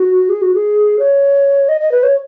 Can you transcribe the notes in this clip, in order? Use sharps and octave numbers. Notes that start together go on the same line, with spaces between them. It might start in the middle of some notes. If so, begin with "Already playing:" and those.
Already playing: F#4
G#4
F#4
G#4
C#5
D#5
D#5
B4
C#5